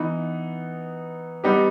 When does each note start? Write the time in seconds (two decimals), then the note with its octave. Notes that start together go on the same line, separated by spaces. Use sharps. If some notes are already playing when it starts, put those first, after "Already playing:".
Already playing: E3 B3 D#4
1.44 G3 B3 D#4 G4